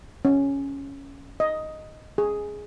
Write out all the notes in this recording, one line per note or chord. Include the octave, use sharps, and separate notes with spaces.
C#4
D#5
G#4